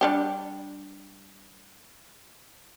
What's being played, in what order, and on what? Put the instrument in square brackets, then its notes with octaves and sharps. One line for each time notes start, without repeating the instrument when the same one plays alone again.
[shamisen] G3 D4 G4